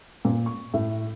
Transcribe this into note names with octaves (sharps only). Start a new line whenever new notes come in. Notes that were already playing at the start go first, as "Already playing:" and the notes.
A#2
C#6
A2